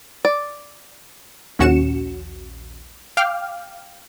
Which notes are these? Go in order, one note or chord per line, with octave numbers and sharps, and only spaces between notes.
D5
A#1 D#2 C#4 F#4 C#7 E7
F5 G5 D6 F6